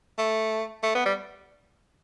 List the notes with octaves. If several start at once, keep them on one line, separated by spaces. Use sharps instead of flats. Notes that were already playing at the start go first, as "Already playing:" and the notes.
A3
A3
B3
G3